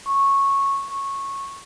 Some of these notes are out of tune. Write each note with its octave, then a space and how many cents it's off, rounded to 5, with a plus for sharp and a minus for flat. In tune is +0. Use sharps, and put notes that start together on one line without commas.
C#6 -10
C#6 -15